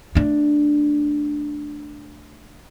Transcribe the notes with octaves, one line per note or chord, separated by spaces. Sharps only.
A3 D4